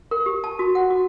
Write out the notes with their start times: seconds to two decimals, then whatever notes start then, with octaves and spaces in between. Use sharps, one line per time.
0.11 A#4
0.26 G4
0.44 A5
0.59 F#4
0.75 F#5
0.90 F#4